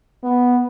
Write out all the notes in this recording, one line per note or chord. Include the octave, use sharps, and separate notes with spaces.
B3